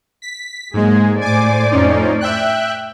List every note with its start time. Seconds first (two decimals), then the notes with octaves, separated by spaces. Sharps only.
0.22 B6
0.74 G#2 F#3 G#3 A#3 G#4
1.21 A2 C5 D5 G#5 D6
1.71 F2 C#4 D#4
2.21 E5 G5 F#6